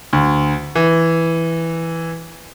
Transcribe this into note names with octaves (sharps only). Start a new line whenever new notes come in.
D2
E3